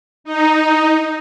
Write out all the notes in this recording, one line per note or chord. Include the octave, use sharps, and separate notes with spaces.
D#4